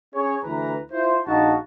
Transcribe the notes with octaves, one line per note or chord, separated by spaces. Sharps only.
C#4 G#4 C#5
D2 E3 B4 A#5
E4 F4 C5
A#1 D#4 F#4 F5 A5